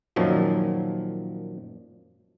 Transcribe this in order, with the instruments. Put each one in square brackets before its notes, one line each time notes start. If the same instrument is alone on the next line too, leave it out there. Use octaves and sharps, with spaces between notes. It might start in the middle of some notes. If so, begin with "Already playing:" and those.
[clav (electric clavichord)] F#2 A#2 D#3 F3 F#3